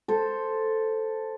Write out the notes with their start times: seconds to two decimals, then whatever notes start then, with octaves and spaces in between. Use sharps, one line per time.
0.08 A4 C5